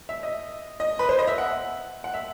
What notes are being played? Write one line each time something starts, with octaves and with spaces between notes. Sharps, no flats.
E5
D#5
D#5
B4
C5
D#5
E5
F#5
F#5
E5